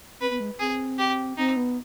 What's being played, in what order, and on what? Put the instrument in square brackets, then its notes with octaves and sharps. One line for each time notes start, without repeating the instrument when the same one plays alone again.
[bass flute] C4 [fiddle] B4
[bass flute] B3
G#3
[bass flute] C4 [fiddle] G#4
[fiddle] G4
[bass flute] C4 [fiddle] D#4
[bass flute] B3